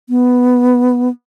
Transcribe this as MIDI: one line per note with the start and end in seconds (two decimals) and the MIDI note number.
0.09 1.09 59